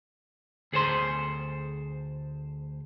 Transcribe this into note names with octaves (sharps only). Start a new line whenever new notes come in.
D2 G#4 A4 C5 C6